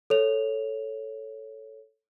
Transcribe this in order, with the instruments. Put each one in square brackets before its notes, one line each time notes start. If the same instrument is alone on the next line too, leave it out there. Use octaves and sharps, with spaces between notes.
[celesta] A4 C#5 F7